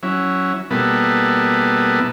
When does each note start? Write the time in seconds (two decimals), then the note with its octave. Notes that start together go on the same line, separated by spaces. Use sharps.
0.03 F#3 C#4 E4
0.70 B2 G3 A#3 B3 E4 A4